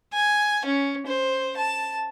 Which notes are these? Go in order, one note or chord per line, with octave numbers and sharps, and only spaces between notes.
G#5
C#4
C5
A5